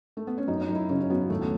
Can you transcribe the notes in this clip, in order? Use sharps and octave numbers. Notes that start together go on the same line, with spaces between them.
A3
B3
C#4
F#2 D#4
D#4
F#2
E4
C#3 C#4
C#4
F#3 B3
D#2 A3
B3